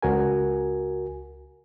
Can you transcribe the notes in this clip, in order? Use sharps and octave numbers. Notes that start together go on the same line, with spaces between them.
C#2 F#4 A#4 G#5